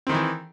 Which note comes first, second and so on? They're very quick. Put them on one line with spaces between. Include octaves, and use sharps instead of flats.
C4 D#3 E4 E3